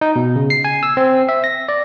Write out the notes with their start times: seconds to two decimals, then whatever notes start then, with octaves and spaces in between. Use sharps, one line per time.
0.01 D#4
0.16 B2
0.36 C#3
0.50 C7
0.64 G#5
0.83 E6
0.97 C4
1.29 E5
1.44 A#6
1.69 D5